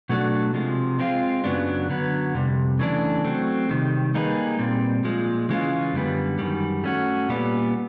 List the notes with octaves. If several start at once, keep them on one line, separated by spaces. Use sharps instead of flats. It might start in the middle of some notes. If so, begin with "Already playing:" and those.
B2 F#3 A3 D4 F#4
C3 F3 G#3
G#3 C4 F4
F#2 C#3 F#3 B3 D4
D3 F#3 B3
F2 C3 G3
C#3 E3 A3 D4
F#3 A3 C4
C3 D#3 G3
G3 A#3 D#4 G#4 B4
A#2 G3 C4
A#2 F3 G#3
C#3 E3 G#3 C#4 F4
F#2 D3 G3 B3
F#2 D#3 G3
A3 C#4 F#4
A#2 G3 B3